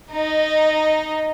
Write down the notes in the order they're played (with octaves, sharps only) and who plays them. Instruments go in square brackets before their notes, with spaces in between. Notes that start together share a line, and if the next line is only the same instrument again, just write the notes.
[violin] D#4 D#5